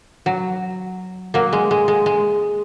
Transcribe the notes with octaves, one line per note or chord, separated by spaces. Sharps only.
F#3
F#3 A#3
G#3
G#3
G#3
G#3